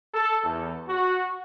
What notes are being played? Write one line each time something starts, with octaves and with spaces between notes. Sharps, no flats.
A4
E2
F#4